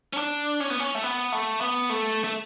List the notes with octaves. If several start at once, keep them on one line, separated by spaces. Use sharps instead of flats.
C#4
D4
C#4
B3
C#4
A3
B3
A3
B3
A3
A3